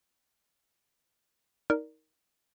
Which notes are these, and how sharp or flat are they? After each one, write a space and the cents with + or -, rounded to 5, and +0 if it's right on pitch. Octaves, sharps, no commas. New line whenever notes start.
D#4 +20 A#4 +0 D5 +0